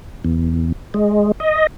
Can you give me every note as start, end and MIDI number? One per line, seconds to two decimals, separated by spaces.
0.25 0.72 40
0.94 1.32 56
1.40 1.67 75